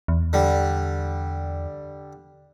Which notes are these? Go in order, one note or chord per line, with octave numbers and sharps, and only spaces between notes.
E2
D3 G3